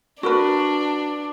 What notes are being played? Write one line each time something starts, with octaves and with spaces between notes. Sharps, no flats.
D4 F#4 A#4 B4